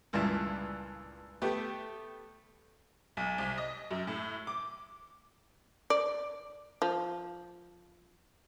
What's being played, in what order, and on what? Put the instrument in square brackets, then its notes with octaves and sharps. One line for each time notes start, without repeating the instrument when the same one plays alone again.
[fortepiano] C#2 G2 A#2 E4 A5
A3 B3 G4
[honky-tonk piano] B1
C2
D#5
F#2
A2
D6
[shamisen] D5
F3